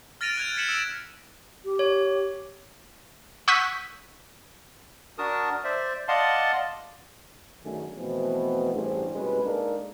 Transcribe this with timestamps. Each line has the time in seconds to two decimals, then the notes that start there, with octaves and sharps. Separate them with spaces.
0.21 F6 A6 A#6 D7 D#7 F7
0.37 F#6 G#6 F7
0.56 G#6 B6 C#7 E7 F#7
0.68 E6 D7 E7
1.65 G4
1.79 C#5
3.48 F#5 C#6 D#6 E6 G6 B6
5.18 D4 F#4 A#4 A5 D#6
5.64 C5 D5 E5
6.08 D5 D#5 F5 F#5 A5 C6
7.63 F#2 D3 D#3 A3 G#4
7.96 B2 E3 F3 A3 B3 C4
8.74 A1 G2 A3 D4 G#4 C5
9.12 C2 B2 G#3 C#4 B4
9.44 G#3 A#3 D4 D#4 A4 A#4